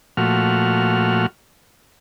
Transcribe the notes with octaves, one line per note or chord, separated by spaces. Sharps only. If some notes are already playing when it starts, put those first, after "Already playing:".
A#2 F3 A3 F#4 F6